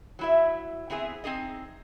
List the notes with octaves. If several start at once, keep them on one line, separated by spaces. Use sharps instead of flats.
F#3 E4 E5
B3 C4 E4 G#4 E5
C4 D#4 G#4 D#5